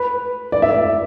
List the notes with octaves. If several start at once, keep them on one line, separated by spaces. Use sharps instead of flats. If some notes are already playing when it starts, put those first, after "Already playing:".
Already playing: B4
D5
E5
D5